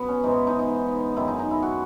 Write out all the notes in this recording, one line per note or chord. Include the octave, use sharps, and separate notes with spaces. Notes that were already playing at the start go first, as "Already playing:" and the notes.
Already playing: F#2 F#3 B3
C#4
G#2 E3 G#3 D#4
D#4
D#4
F#2 D#3 G#3 E4
D#4
D#4
E4
F#4